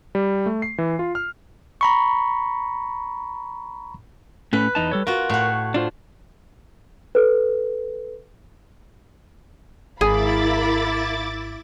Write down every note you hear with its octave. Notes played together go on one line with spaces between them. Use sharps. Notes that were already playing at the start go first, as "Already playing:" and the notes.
G3
A3
C7
E3
F4
F6
A#5 B5 C#6
A2 A3 C#4 B4
E2 D#4 A5
G3 A4 C#5
F4 F#4 A#4
A2 F#5
D4 F4 C5
A4 B4
G#1 E4 G#4 A#4 F5 B5 D6 A6